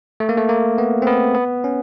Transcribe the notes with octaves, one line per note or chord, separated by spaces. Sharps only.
A3
A#3
A3
A#3
B3
C4
B3
B3
C#4